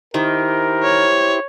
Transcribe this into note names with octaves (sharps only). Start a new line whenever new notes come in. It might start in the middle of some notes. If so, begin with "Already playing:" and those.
D#3 E4 G4 A#4 C5
C#5